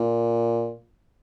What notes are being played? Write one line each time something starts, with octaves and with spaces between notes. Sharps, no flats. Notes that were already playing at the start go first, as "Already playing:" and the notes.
Already playing: A#2